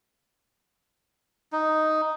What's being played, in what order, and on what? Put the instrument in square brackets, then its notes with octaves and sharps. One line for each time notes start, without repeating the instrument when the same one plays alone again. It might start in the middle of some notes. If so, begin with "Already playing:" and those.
[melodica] D#4